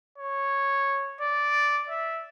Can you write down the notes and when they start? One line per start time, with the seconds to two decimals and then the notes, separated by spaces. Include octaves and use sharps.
0.18 C#5
1.21 D5
1.90 E5